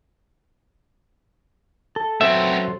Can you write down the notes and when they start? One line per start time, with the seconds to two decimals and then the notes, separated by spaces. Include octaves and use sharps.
1.96 A4
2.21 F#3 B3 C4 A4 C5 E5